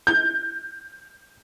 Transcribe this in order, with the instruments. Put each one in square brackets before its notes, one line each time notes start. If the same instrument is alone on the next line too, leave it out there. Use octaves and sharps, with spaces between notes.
[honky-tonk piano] G6